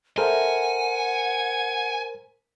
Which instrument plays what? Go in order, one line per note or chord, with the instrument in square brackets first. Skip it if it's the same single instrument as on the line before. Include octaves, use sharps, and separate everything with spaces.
[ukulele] A4 D5 E5 [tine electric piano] A#4 C5 [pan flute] F#5 [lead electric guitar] G#5